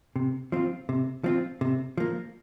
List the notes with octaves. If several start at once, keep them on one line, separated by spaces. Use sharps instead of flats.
C3
F3 C4 F4
C3
F3 C4 F4
C3
F3 A#3